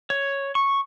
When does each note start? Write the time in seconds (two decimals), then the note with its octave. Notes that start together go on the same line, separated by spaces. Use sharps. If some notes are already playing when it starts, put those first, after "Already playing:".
0.10 C#5
0.55 C#6